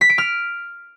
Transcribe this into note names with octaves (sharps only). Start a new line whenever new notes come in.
B6
D7
F6